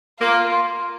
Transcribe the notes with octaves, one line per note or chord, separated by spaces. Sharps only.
A#3 F4